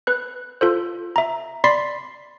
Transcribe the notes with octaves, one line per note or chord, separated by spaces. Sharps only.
B4 F#6
F4 A4 C5
E5 A#5
D5 B5 C6 A6 B6 C7